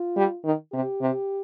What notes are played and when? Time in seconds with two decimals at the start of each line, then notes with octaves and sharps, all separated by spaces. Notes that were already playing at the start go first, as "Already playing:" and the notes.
Already playing: F4
0.17 G3
0.45 D#3
0.73 C3 G4
1.01 C3